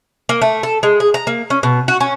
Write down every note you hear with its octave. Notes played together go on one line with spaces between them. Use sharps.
A#3
A3
A4
G#3
G#4
A#5
A#3
C#4
B2
F#4
C#4